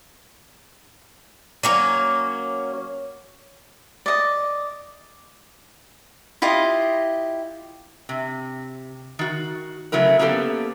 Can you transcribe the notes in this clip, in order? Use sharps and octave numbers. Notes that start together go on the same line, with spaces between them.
F#3 A#3 C#4
D5 D#5
E4 F4 G4 D#5
C3
D#3 F#4
C#3 F#3 A3 E4 A#4
A#3 B3 C#4 G4 A4